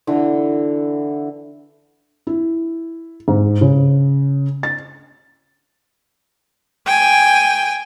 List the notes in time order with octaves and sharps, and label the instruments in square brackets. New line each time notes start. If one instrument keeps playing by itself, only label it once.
[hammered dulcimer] D3 E3
[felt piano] E4
G#2
C#3
A6
[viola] G5 G#5